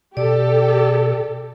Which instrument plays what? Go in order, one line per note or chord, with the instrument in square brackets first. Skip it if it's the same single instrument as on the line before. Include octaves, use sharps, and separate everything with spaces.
[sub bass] B2 [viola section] G4 A4 [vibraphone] D5